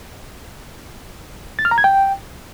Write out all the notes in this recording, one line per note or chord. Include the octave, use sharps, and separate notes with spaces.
A6
F6
A#5
G#6
G5